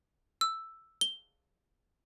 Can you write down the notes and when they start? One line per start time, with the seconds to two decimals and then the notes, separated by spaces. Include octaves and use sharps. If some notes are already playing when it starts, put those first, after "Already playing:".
0.41 E6
1.01 G7